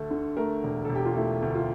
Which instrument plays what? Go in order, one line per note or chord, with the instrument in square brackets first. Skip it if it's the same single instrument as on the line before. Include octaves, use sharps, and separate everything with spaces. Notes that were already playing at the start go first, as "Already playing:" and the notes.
Already playing: [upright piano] D2 A3 A4
D3
A3 A#4
E1
E1 A4
G4
F4
A3 E4
D2
F4